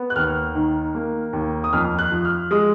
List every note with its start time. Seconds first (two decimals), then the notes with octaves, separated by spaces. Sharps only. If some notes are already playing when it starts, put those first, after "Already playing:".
Already playing: B3
0.10 F#6
0.16 D#2 F6
0.55 D#3
0.95 A#3
1.33 D#2
1.64 D#6
1.73 F2 F6
1.99 F#6
2.12 F3
2.25 F6
2.51 G#3 D#6